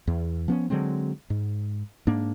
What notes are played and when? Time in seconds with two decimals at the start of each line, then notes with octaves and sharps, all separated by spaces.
0.07 E2
0.48 F3 B3 C#4
0.70 D3 F#3 G#3 C4
1.30 G#2
2.07 G#2 A#3 D4